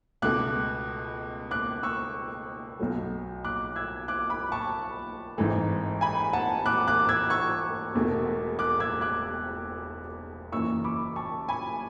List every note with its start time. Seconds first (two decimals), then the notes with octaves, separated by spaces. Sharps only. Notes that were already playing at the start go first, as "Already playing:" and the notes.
0.22 C#2 B2 A3 D6 F#6
1.51 D6 F#6
1.83 C#6 E6
2.79 B1 B2 F#3 A3
3.44 D6 F#6
3.76 E6 G#6
4.08 D6 F#6
4.30 B5 D6
4.52 A5 C#6
5.38 G#1 G#2 E3 A3
6.01 G#5 B5
6.33 F#5 A5
6.66 D6 F#6
6.88 D6 F#6
7.09 E6 G#6
7.30 C#6 E6
7.95 E1 E2 B2 A3
8.59 D6 F#6
8.80 E6 G#6
9.01 D6 F#6
10.52 F#1 F#2 E3 C#6 E6
10.84 B5 D6
11.16 A5 C#6
11.49 G#5 B5